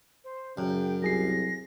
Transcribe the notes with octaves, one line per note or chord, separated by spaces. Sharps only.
C5
F#2 C#3 G5
C2 F#3 G#4 A#6 C7